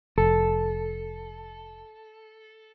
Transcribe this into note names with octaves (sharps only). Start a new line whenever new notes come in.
F1 A4